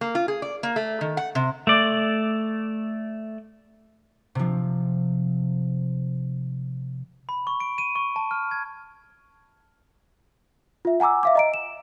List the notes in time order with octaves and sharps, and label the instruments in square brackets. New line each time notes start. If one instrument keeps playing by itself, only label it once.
[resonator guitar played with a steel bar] A#3
F4
G#4
D5
A#3
A3
D#3
F#5
C3
[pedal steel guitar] A3 D5
[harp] C3 F3
[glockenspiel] B5
C#6
D7
D#7
C#6
A5
F6
G#6
[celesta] F4 E5
F#5 G#5 A#5 D6 E6
E5 F5 D6
D#5 A#5 D7
E7